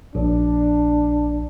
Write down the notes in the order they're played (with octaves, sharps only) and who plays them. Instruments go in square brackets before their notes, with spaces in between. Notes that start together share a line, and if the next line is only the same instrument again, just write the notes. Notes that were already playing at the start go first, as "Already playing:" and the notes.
[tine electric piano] A#1 [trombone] D4